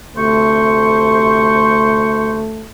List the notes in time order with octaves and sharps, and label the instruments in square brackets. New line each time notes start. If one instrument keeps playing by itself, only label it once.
[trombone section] D2 A3 [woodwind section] C3 C5 C#6